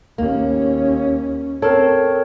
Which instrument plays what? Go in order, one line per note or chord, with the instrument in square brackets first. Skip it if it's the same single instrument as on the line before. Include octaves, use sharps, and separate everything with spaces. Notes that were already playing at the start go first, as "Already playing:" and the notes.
[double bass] D#2 C#4 [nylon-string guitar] A#3
[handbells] C4 A#4 C#5 [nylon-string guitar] A4